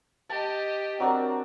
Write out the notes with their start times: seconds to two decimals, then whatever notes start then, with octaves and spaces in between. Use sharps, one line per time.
0.29 G4 D#5 A5
1.00 F#3 C4 D4 A#4